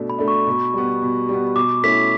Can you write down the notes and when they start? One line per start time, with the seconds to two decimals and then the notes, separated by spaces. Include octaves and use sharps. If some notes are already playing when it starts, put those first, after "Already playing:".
Already playing: B2 A3 D4
0.10 B5
0.19 A3 D4
0.28 C#6
0.47 B2
0.74 G3 B3
1.02 B2
1.29 G3 B3
1.55 B2 D6
1.83 A3 C#4 E4 B6